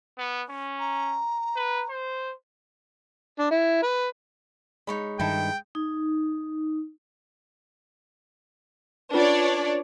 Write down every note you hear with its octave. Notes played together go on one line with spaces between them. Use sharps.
B3
C#4
A#5
B4
C5
D4
E4
B4
G#3 D#4 C#5 B5
G2 D#3 D#4 E4 A4 G5
D#4
C#4 D4 F4 B4 C#5 D5